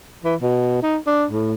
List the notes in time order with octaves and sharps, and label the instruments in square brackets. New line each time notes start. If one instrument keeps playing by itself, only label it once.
[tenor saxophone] E3
B2
D#4
D4
A2